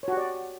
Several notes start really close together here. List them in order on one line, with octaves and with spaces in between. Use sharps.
C#5 F#4 G4 D5